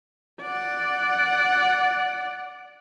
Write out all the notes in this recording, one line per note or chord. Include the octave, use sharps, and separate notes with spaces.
D5 F#5